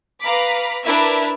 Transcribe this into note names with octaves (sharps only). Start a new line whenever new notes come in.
B4 F5 A#5 B5 D6 B6
D4 E4 A#4 B4 E5